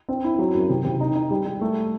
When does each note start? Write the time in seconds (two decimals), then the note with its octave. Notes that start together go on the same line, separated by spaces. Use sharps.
0.09 C4
0.24 E4
0.39 F#3
0.55 F#2
0.70 C3
0.84 C3
1.00 D#4
1.15 D#4
1.31 G3
1.45 G3
1.61 A3